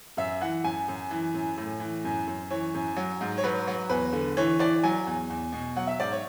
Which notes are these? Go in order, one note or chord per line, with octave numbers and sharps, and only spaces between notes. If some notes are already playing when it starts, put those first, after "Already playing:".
F#2 E5
E3 F#5
F#2 G#5
F#2
E3
F#2
A2
E3
F#2
F#2
E3 C#5
F#2
F#3
G#2
C#5
F#3 B4
F#3
E2 B4
D3
E3 C#5
E3 D5
F#3 G#5
E2
E2
B2
F#3 F#5
E5
G#2 D5
C#5